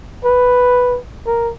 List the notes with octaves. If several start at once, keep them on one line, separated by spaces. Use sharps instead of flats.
B4
A#4